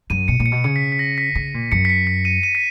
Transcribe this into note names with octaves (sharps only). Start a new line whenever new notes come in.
F#2 D#7
B2 C#7
A#2
C#7
B2
C#3 C#7
B6
B6
A#6
B6
C#3
A#2
F#2 C#7
B6
C#7
B6
D#7
D#7
B6